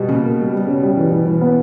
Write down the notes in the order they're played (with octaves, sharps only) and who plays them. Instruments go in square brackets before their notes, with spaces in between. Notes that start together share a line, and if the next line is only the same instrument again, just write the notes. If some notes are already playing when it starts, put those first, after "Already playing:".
Already playing: [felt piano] B2 G3
[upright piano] A#2 [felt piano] C#3
[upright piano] A#3
G3
G3
C#3
G3
E3
E3
E3
B3